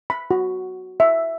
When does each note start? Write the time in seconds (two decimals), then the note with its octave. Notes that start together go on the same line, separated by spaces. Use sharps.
0.10 B5
0.31 F#4
1.00 E5